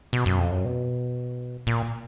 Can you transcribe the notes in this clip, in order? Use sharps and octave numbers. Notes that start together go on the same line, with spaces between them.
B2
F#2
F2
F#2
B2
A#2